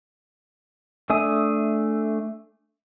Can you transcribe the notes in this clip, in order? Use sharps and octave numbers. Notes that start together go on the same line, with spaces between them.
A3 D4 E5 G#5 D#6